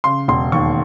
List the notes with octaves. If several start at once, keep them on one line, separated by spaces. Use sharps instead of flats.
C#3 C6
E1 C6
D#2 C#6